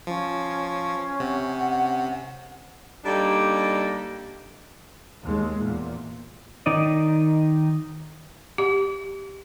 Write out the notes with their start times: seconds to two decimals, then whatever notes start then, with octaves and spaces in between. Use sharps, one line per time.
0.07 F3 C#4
1.20 C3 F#5
3.04 G3 A#3 D4 D#4 G4 A4
5.23 D#2 G#3
5.59 E2 A#2
6.66 D#3 D#4 D5 D#5
8.58 G4